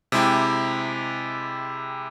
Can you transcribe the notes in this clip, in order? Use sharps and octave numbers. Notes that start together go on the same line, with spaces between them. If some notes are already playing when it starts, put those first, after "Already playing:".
C3 G#3 E4 G4